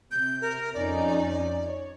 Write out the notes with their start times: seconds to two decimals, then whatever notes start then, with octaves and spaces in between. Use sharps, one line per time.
0.11 C3 G6
0.41 A#4
0.74 F2 C#4 D#4 D5
1.64 C#5